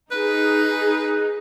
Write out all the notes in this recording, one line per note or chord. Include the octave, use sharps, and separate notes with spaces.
D#4 G#4 B4